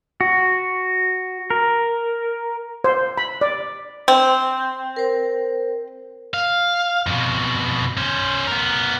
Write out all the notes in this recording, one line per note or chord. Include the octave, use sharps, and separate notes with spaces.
F#4
A#4
C5
B5
D5
C4
A#4 C5
F5
F2 B2
C#4 C5
B3 A#4